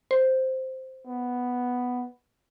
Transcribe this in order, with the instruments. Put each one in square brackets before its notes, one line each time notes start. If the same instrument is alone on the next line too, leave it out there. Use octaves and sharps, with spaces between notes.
[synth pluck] C5
[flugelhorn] B3